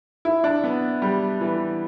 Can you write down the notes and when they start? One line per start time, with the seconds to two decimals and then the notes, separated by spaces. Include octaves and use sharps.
0.25 E4
0.44 D4
0.64 B3
1.02 G3
1.40 E3